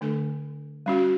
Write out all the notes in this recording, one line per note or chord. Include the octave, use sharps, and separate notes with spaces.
D3 A3 D4 A4
G3 C#4 F#4